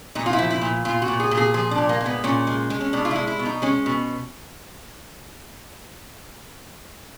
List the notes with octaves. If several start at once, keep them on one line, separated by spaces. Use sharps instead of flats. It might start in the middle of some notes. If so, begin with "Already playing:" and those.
A#2 D#4
F4
E4
F3
E4
A#2
A#2 F4
F#4
A#2
G#4
A#2
G#4
F3 G#4
D4
A#2
A#3
G#3
B3
A#2 C#4
G#3
G#3
C#4
B2 D4
F4
G#3 E4
E4
B2
D#4
G#3 C#4
B2